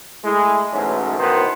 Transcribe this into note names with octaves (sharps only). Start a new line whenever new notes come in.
G#3 A3 E4
B1 G#2 E3 F#3 A3 C#4
B2 D#3 E3 B3 C5